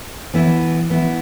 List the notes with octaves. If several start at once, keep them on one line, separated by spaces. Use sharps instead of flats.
E3 B3 E4
E3 B3 E4